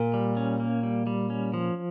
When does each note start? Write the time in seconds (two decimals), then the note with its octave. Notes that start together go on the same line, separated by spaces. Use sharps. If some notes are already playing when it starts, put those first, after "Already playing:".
Already playing: A#2
0.14 G3
0.37 C#4
0.60 A#3
0.83 G3
1.07 G3
1.30 C#4
1.54 F3